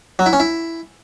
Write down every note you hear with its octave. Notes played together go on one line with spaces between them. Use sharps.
F#3
E4
C#4
E4